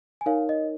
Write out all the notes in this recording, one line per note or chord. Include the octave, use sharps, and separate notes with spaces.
G#5
D#4 A#4 C#5 F5
D#5